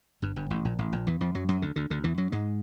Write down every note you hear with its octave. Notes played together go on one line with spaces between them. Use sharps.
G1 G2
G1 G2
A1 A2
A#1 A#2
A1 A2
A#1 A#2
E2 E3
F2 F3
F#2 F#3
F#2 F#3
D2 D3
D2 D3
D2 D3
E2 E3
F#2 F#3
G#2 G#3